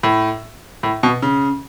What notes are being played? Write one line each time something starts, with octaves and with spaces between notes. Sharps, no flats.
A2
A2
B2
C#3